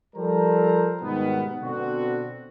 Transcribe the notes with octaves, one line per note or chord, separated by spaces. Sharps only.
F3 G3 A4 A#4 C5 A#5
G#2 B2 D#3 G3 B3
B2 D3 B3 C4 F#4